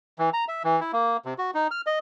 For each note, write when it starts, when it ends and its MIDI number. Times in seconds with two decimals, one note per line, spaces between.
0.19 0.30 52
0.33 0.45 82
0.48 0.63 76
0.64 0.80 52
0.81 0.92 64
0.93 1.17 58
1.25 1.34 48
1.38 1.51 66
1.54 1.67 63
1.71 1.81 89
1.87 1.99 75